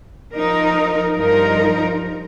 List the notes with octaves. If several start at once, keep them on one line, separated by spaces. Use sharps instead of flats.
F3 D#4 A#4
G2 F3 D#4 A#4